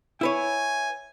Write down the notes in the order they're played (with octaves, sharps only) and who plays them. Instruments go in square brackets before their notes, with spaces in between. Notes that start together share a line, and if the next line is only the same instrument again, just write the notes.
[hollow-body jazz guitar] E4 B4 C#5 [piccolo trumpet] G#5